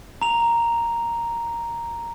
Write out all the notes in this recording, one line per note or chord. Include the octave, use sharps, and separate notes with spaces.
A#5 F7